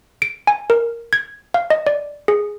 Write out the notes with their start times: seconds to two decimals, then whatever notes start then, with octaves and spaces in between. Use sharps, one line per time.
0.22 D7
0.47 G#5
0.70 A#4
1.13 G#6
1.54 F5
1.70 D#5
1.87 D5
2.28 G#4